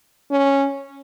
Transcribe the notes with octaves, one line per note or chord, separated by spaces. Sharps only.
C#4